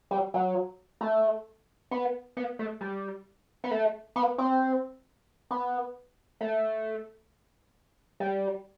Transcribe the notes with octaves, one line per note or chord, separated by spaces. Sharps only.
G3
F#3
A3
B3
B3
A3
G3
B3
A3
B3
C4
B3
A3
G3